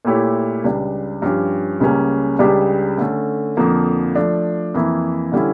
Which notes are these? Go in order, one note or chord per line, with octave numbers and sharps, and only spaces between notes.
A#2 A3 E4 G4 C#5
C#2 C#3 G3 D4
G2 F3 C#4 G4
C#2 C#3 G3 A#3 C#4
C#2 C#3 G3 D4 G4
D3 A3 C#4
F2 D3 F3 A#3
F3 A3 D4
F2 E3 A#3 E4
D3 G3 C#4 E4